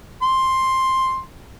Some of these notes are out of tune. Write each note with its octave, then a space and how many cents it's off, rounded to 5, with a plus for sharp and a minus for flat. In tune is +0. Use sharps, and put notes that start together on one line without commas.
C6 +10